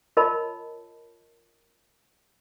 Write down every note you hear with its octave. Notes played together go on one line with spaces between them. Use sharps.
F4 A#4 C#5 D#5 A5 B5